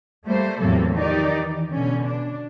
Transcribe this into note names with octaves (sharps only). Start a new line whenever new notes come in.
G3 A3 A#3 C5
E2 A2 C3 F#3 A#3 A4
D#3 F3 D#4 G4 D5
E3
B2 D3 C#4
D4